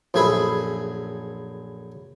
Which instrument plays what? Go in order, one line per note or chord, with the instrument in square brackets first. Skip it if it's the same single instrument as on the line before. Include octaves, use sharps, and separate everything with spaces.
[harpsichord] A#1 F#2 A3 G#4 E5 B5